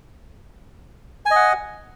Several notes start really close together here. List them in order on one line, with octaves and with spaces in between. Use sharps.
G#5 D#5 F#5